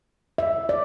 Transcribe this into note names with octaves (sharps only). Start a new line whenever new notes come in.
E5
D5